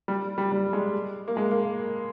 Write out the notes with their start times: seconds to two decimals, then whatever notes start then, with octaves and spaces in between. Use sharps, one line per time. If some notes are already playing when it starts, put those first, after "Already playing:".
0.08 G3
0.38 G3
0.52 G3
0.73 G#3
1.28 A#3
1.37 G#3
1.51 A#3